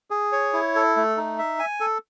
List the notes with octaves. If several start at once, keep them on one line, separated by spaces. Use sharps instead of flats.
G#4
C#5
E4
A4
A3
D#4
E5
G#5
A4